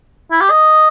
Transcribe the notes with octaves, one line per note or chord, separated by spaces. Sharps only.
E4
G4
D#5